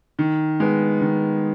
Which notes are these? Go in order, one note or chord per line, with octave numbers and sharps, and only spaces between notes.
D#3
G#3 B3
D#3